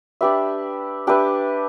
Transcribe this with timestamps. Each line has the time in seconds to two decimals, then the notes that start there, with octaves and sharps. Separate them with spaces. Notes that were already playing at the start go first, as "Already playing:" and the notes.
0.21 D4 G4 B4 E5
1.07 D4 G4 B4 E5